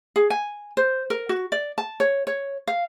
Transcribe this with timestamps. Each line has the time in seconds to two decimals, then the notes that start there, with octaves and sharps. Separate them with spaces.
0.16 G#4
0.30 G#5
0.77 C5
1.10 A#4
1.29 F#4
1.52 D5
1.78 A5
2.00 C#5
2.27 C#5
2.67 F5